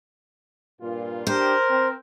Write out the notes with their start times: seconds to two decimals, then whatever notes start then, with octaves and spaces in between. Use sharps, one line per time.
0.81 G2 A#2 F4
1.27 D4 G4 A#4 C5
1.69 C4